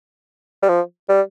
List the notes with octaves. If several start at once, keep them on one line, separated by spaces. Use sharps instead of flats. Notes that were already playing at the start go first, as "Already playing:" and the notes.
G3
F3
G3